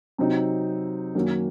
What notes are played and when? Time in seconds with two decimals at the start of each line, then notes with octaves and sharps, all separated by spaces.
0.18 C3 F#3 C4 D#4
1.15 F#2 D#3 A#3 C#4 F#4